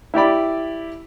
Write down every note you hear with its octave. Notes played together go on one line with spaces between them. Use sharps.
E4 G4 D5 B5